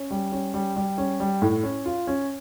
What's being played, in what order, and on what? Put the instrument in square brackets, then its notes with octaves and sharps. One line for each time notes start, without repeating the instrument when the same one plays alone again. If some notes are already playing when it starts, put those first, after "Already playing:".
Already playing: [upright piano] C#4
G3
C#4
G3
G3
C#4
G3
A2
C#4
F4
C#4